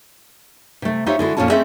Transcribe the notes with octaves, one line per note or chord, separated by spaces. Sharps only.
C3 A3
D#4 F4 G4 C5 C#5 E5
D3 G#3 E4 F#4
F2 A#2 C#4 F4 C#5 A5
A3 C4 C#4 D#4 G#4 E5